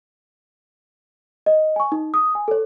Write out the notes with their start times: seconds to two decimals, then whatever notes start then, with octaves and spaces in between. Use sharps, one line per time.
1.46 D#5
1.76 G#5 C#6
1.92 D#4
2.14 D#6
2.35 G#5
2.48 A4 C#5